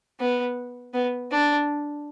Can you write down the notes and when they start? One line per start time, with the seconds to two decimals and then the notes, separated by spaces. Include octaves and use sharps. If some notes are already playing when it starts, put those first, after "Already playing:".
0.20 B3
0.94 B3
1.31 D4